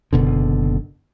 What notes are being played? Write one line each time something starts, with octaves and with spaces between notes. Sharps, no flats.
F#1 B2 D3